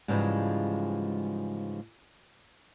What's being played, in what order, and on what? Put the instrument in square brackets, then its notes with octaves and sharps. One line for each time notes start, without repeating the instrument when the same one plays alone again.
[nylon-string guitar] G#2 C#3 E3 F3 G3 G#3